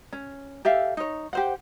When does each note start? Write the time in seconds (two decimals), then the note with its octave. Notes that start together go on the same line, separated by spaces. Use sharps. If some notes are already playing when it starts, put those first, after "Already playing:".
0.13 C#4
0.65 G4 A4 E5 F5
0.97 D#4 C#5
1.33 G4 C5 F#5